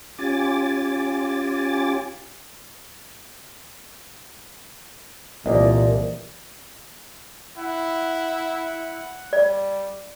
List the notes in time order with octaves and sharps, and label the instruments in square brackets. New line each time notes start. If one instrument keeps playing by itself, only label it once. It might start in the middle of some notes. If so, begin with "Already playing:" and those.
[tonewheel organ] C#4 F4 G4 G#5 D6 A6
[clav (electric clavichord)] C2 [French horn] A#2 [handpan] E3 D5 D#5
[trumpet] E4 [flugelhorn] F#5
[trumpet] G3 [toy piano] D5